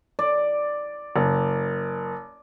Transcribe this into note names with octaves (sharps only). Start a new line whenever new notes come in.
D5
F#1